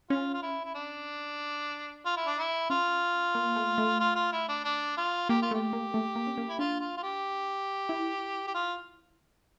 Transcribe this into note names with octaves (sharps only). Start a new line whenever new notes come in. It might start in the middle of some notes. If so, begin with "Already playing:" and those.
C#4 F4
F4
E4
E4
D4
F4
E4
D4
E4
C#4 F4
A#3
A3
A3
F4
F4
E4
D4
D4
F4
A#3 G4
F4
A3 G4
A#3
A3
A#3
C#4
A#3
E4
D4 F4
F4
F4
G4
E4
G4
F4